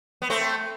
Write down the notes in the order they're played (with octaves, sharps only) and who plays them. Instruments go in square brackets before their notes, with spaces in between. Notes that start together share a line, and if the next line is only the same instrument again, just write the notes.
[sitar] B3
A3 C4